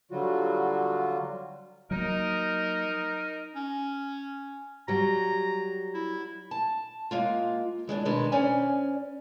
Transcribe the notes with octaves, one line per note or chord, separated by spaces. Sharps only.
D3 F#3 G3 F4 F#4
F#3 A#3 D#4 A#4
C#4
F#3 G3 A#5
E4
A5
G#3 A#3 F4
E3 G#3 C4 D4
B2 D#3 G#3 D4 B4 A#5
C#4 C5 D5 G#5